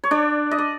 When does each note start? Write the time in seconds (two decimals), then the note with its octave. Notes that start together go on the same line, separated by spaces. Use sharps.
0.04 C#5
0.11 D4 D5
0.51 D#5
0.58 D5